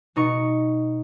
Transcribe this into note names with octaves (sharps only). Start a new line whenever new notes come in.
B2 D#4 D#5 C#6